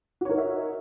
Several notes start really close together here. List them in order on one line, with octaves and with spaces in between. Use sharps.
F#4 C#5 A#4 D#4 E5